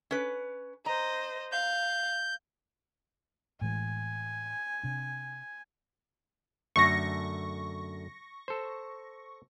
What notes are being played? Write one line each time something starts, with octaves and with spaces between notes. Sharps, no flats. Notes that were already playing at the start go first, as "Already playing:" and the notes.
C#4 B4
C5 D#5 A#5
F5 G6
A2 E3 G#3 G#5
C3 D4
F#2 D3 A3 C#6 A#6
A4 C5